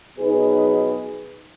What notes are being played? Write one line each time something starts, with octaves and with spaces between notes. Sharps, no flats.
B2 F#3 D#4 G#4 B4